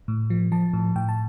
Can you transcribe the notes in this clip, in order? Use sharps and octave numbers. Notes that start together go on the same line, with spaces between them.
A2
F3
F3 A5
A2
A2 G5
A5